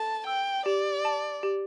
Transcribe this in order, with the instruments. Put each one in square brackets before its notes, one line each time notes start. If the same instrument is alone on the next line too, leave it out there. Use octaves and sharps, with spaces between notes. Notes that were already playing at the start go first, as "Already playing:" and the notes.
Already playing: [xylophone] A4 [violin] A5
[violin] G5 [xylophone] E6
[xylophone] G4 [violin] D5
[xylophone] A5
G4